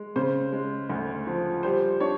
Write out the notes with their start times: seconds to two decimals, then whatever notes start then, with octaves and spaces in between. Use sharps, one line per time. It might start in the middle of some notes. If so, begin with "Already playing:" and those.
Already playing: G#3
0.16 C#3 C5
0.52 G#3
0.90 D2
1.27 F3
1.63 G3 C5
2.00 D4 C#5